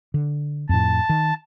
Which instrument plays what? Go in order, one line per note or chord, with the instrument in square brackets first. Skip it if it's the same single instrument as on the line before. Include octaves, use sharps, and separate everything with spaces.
[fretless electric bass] D3
[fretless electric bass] F2 A2 [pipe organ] A5
[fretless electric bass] D#3